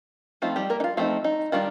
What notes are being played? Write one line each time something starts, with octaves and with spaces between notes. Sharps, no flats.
F3 A3 C4 D#4 F4
G3 G4
A#3 A#4
D#4
F4
F3 A3 C4 D#4 F4
D#4
D#3 G3 D4 F4